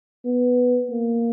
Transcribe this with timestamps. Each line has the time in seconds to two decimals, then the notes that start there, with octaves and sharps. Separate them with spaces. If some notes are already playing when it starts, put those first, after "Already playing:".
0.26 B3
0.90 A#3